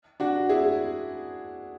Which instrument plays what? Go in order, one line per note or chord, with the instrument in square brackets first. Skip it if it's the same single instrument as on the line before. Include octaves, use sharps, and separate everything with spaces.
[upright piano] D4 F#4
E4 G#4